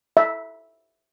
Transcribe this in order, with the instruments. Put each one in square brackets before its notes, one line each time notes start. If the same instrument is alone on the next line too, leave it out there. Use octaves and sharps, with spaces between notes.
[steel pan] E5